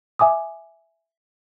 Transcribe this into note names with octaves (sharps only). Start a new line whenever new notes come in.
E5 G#5 D6 D#6